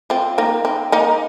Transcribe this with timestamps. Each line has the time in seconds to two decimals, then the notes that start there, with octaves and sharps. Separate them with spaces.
0.10 C4 F4
0.38 A#3 D#4
0.65 C4
0.92 A#3 D#4